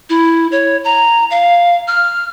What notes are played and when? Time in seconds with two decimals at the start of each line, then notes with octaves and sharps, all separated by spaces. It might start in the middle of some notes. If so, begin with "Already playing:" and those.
0.09 E4
0.52 C#5
0.84 A#5
1.30 F5
1.88 F6